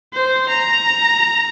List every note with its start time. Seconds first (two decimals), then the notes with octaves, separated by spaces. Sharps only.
0.13 C5
0.49 A#5